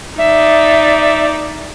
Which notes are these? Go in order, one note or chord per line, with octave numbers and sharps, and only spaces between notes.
D#4 D5 E5